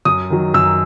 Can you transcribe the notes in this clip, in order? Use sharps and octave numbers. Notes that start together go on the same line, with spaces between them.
F#2 D#6
D#3 F#3
F#2 E6